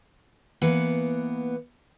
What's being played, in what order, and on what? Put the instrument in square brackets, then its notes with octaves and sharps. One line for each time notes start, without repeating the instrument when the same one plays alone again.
[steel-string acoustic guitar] E3 A#3 B3 B4 F#5